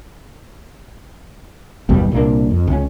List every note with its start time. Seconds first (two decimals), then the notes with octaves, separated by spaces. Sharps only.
1.89 F#1 D#2 B2 G3
2.11 C2 A#2 A#3 D4
2.51 F2
2.67 C#2 C#4